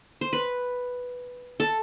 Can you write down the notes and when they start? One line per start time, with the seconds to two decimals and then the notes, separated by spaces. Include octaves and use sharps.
0.21 C5
0.33 B4
1.60 A4